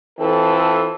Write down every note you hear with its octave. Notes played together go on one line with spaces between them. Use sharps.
E3 C4 F4 A4